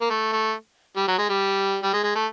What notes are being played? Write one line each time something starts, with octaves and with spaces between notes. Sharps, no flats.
A#3
A3
A3
G3
F#3
G#3
G3
G3
G#3
G#3
A3